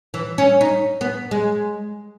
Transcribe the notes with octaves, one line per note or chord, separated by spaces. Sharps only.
E3
C#4
D#4
B3
G#3